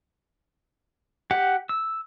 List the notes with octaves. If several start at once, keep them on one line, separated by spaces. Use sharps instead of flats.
G4 F#5
E6